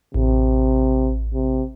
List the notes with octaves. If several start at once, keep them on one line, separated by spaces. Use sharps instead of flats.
A1 C3
C3